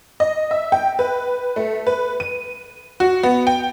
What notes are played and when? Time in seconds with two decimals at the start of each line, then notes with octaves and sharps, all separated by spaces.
0.20 D#5
0.51 E5
0.72 G5
0.99 B4
1.56 A3
1.87 B4
2.20 D#7
3.00 F#4
3.23 B3
3.47 G5